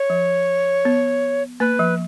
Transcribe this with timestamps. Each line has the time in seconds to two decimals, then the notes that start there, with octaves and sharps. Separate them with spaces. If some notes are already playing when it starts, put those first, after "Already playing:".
Already playing: C#5
0.10 F3
0.85 B3
1.60 A#3 B4
1.79 F3